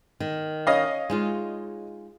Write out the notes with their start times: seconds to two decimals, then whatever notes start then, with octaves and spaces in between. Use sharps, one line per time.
0.20 D#3
0.67 C#4 D#5 F5
1.10 G#3 D#4 F4